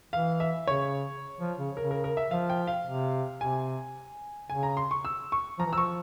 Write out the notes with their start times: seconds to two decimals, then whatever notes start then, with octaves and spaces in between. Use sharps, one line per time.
0.12 E3 F5
0.40 E5
0.67 C#3 C#5
1.40 F3
1.58 C#3
1.77 C#3 A#4
1.91 A#4
2.04 A#4
2.17 E5
2.31 F3 F5
2.50 G5
2.67 F5
2.86 C3
3.40 C3 G#5
4.50 C#3 G#5
4.63 A#5
4.77 C6
4.91 C#6
5.05 E6
5.32 C#6
5.59 F3 A#5
5.66 E3
5.73 F3 C#6 E6